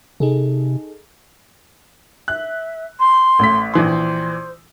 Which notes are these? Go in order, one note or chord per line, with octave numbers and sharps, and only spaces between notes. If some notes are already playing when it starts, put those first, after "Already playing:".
C3 D#4 G#4 A4
E5 F#6
C6
A1 A2 B6
A#1 E3 C5 C6